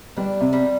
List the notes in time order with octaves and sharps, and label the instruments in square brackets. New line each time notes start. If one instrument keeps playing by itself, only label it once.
[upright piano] G3 [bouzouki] D4
[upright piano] C3
[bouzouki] G3